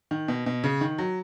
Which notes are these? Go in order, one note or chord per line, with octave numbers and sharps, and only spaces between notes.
D#3
B2
B2
C#3
D#3
F#3